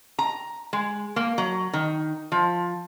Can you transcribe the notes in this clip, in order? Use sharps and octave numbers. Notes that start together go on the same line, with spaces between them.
A#5
G#3
A#3
F#3
D#3
F3